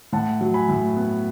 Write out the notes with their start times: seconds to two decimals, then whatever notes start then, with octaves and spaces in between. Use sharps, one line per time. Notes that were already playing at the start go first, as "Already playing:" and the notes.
0.13 A2 F#5 A5
0.41 F#3
0.54 G#5 B5
0.68 A2
0.97 B3